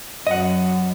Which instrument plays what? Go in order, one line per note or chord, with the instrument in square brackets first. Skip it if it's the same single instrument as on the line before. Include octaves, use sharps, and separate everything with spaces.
[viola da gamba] F#2 [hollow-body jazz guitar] D#5 F#5